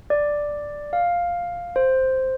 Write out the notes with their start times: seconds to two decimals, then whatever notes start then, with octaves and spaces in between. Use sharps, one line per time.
0.10 D5
0.93 F5
1.76 C5